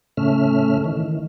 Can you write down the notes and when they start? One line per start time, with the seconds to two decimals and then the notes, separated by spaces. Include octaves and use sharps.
0.17 A2 C#3 A3 C#4 E5 F6
0.84 D#3 E3